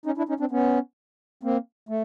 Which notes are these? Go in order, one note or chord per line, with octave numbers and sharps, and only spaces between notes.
C#4 D#4
D4 E4
C#4 D#4
C4 D4
B3 C#4
A#3 C4
A3